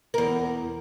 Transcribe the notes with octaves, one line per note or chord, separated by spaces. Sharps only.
E2 A#4